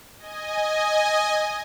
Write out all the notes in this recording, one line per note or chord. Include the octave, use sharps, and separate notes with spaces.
D#5 G#5